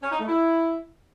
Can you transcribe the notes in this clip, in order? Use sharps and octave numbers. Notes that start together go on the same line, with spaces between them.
C#4
D#4
A3
E4